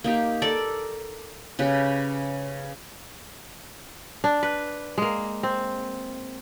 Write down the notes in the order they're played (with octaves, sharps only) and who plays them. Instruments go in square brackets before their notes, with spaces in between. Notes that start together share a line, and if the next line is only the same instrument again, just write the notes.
[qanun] A#3 D#4 G4
A4 A#4 D5
C#3 G4 B4
[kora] D4
B4
G#3 A#3
C4